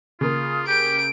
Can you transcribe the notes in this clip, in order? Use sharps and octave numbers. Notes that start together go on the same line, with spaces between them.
C#3 A#3 F4 D#6
G4 G6 D7